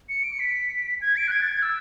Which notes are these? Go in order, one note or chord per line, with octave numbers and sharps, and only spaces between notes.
C#7
D7
C#7
B6
G#6
D7
F#6
G#6
A6
G#6
E6